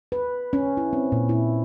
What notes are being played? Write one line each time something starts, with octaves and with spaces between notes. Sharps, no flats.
B4
C#4
E4
C4
A#2
E4